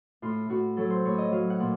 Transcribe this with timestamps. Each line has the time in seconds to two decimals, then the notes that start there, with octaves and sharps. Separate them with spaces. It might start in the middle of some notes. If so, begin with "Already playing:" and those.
0.22 A2 F4
0.49 A2 F#4
0.77 F#3 A4
0.90 C5
1.05 A2 C#5
1.18 D#5
1.32 F#3 F5
1.50 F#5
1.60 A#2